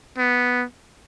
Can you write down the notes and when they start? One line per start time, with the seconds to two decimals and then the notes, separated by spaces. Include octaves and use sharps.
0.18 B3